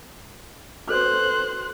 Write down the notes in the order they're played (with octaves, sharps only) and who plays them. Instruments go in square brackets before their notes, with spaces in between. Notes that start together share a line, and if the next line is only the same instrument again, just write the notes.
[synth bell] F#4 A4 B4 [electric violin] C5 F#6